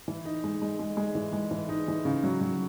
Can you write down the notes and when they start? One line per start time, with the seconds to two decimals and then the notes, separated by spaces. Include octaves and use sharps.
0.08 E3
0.25 D#4
0.44 G#3
0.62 G#3
0.79 G#3
0.97 G#3
1.15 E3
1.33 G#3
1.51 E3
1.69 D#4
1.88 E3
2.05 C#3
2.23 F#3
2.41 F#3